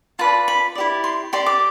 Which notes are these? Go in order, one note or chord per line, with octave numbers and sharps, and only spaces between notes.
F4 B4 D5 A5
B5
E4 G4 D5
C6
G4 D5 C6
D6